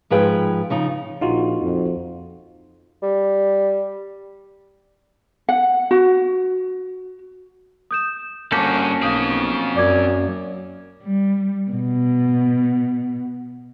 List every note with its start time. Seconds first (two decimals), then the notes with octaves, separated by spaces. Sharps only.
0.10 G#2 F3 G#4 B4 G5
0.70 C#3 F3 D#4
1.21 A#1 D#4 F4 F#4
1.60 F2
3.03 G3
5.49 F#5
5.91 F#4
7.91 D#6 G6 E7
8.52 G2 A#3 C#4 F#4 A4 D6 G6
9.02 B1 C4 F5 D#6
9.76 F#2 D5 D6 G#6
11.03 G3
11.71 B2